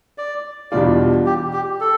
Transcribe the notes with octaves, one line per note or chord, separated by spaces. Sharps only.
D5
E2 B2 G3 D4 F4 D5
G4
G4
A4